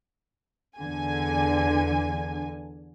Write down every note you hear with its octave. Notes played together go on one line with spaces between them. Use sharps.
E2 D3 G#5